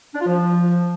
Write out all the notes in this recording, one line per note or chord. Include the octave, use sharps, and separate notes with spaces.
D4
F4
F3